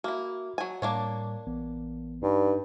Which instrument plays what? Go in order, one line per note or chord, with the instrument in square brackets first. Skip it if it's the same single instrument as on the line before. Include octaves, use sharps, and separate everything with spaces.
[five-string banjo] A#3 E4 [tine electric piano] F#4 E5 F6
[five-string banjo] F#3 G#5
[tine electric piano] A2 G3 [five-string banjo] A#3 D4 C#5
[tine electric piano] A1 E3 B3
[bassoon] G2 [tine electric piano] D#4